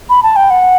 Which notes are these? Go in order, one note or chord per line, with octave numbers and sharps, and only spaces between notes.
B5
A5
G5
F#5